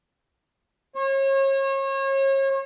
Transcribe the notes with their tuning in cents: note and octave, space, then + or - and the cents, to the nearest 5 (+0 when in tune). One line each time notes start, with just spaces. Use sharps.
C#5 -35